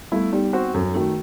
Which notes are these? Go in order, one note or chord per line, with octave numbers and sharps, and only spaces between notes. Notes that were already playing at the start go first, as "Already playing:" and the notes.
G3 A3 B3 E4
G3 B3 D#4
C4 F#4 C5
F#2 A4
D#3 A3 F#4 A4